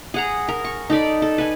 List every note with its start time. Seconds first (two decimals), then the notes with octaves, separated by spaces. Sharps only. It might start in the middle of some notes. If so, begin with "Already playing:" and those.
0.14 G#4 F#5 A#5
0.48 A#4
0.65 C#6
0.90 D#4 A4 D5 B5
1.22 A4
1.38 B4 G#5